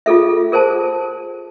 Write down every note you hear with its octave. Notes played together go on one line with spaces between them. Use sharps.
F4 G#4 A4 E5
G#4 A#4 C5 G#5 A5